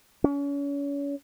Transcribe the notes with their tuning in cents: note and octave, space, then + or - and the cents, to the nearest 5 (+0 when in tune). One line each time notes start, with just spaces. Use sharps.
C#4 +35